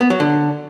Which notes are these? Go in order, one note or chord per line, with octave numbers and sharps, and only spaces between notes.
B3
F#3
D3